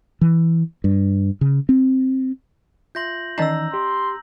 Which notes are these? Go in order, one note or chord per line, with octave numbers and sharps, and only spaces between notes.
E3
G2
C#3
C4
F4 E5 C6 G6 A#6 F#7
D#3 E3 C#4 D#4 D5 D#5 A#5 E6
G4 C6